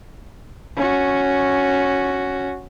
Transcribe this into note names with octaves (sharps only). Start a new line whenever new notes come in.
C#4 F#4